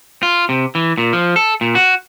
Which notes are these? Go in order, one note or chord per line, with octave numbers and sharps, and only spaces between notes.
F4
C3
E3
A#2
F3
A4
A#2
F#4